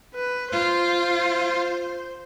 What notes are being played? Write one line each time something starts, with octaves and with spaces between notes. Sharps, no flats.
B4
F4 C5